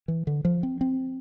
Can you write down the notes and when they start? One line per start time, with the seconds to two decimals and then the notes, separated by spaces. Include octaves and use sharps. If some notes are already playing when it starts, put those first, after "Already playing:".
0.08 E3
0.27 D3
0.45 F3
0.63 C4
0.81 C4